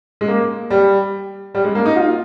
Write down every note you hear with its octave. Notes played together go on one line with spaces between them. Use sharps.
G#3
A#3
G3
G3
G#3
A#3
D#4
F4